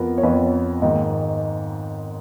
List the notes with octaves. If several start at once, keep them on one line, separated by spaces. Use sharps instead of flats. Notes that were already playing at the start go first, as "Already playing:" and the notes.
Already playing: F2 F3 B3 A#4
C#5
F2 F3 B3 B4
G#2 D#3 A#3